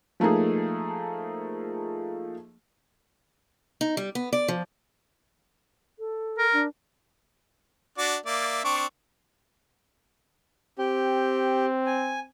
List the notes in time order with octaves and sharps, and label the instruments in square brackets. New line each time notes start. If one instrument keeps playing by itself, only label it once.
[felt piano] F3 A3 A#3 D#4 G#4
[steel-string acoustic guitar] D#4
G3
B3
D5
F3
[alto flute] A4
[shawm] A#4
[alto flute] D4
[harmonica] D4 F#4 D5
A#3 D5 E5
C4 D4 C#6
[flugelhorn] C4 [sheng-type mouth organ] G4
[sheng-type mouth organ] G#5